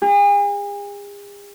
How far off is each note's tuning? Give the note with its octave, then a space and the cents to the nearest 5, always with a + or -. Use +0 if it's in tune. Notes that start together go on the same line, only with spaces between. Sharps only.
G#4 -40